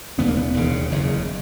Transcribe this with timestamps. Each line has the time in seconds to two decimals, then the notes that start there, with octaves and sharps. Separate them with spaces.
0.18 E1 D#2 C#3 B3
0.28 A#3
0.37 B3
0.54 E1 D#2 C#3
0.91 F#1 E2 C#3